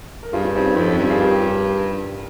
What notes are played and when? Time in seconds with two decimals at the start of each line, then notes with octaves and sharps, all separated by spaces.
0.23 A#4
0.33 G2 F4 G#4
0.44 C#4 F4
0.55 G2 C4 D#4
0.66 C#4
0.76 F2 C4
0.87 C#4
0.99 G2
1.10 F4 G#4
1.20 G4 A#4